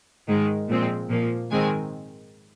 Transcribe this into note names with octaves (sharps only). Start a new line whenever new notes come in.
G#2 D#3 G#3
A#2 F3 G#3 C4
A#2 F3 A#3
G#2 D#3 G#3 C4 G#5